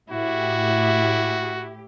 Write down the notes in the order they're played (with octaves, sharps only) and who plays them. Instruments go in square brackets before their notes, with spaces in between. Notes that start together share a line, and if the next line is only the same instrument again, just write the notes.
[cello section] A2 G4 [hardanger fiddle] E4 [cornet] F#4